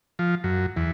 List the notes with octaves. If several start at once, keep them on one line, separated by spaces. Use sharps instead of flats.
F3
F#2
E2